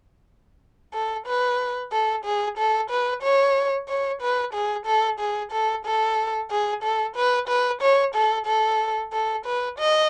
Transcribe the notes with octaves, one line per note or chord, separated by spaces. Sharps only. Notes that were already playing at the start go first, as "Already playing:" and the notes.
A4
B4
A4
G#4
A4
B4
C#5
C#5
B4
G#4
A4
G#4
A4
A4
G#4
A4
B4
B4
C#5
A4
A4
A4
B4
D#5